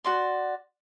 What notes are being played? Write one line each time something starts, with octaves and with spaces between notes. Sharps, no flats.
F#4 D5 C6